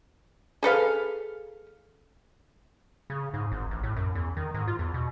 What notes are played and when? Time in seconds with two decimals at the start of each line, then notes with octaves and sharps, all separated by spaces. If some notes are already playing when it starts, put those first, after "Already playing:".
0.63 G#4 A4 B4 F5
3.10 C#3
3.34 G#2
3.52 G#1
3.71 A1
3.83 A2
3.96 F#2
4.15 E2
4.37 D#3
4.54 G#2
4.68 F4
4.79 E2
4.94 B2